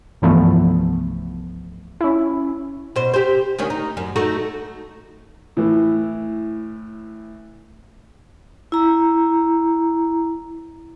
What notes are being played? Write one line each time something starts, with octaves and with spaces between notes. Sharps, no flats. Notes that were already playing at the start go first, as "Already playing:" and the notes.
C2 G2 E3 F3 A3 B3
C#4 E4
B2 C5
G4 C5
D2 D#3 C#4
D#4
F#2
A3 D#4 F#4
A2 E3
E4 A#5